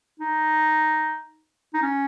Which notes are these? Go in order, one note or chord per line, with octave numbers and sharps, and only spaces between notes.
D#4
D#4
C#4